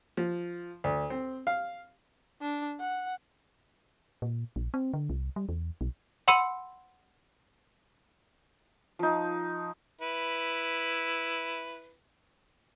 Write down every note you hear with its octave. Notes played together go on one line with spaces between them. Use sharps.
F3
D2
C4
F5
D4
F#5
A#2
A#1
C4
D3
C2
G3
E2
B1
F#5 B5 C6 E6 C#7 D#7
F3 D#4
E4 B4